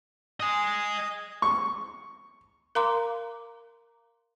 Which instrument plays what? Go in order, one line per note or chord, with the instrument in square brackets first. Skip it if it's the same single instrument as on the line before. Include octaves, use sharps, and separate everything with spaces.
[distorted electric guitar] D#5 G#5 [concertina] D#6
[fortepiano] C#6
[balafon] A#4 F5 A#5 C6 D6